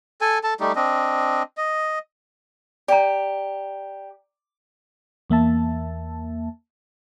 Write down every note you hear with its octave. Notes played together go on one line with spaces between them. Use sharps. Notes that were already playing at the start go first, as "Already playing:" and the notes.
A4 G#5
A4 A5
G3 A3 D#4 G4
C4 D4 D#5
D#5
G4 D5 A#5
E2 A#3 E5 A5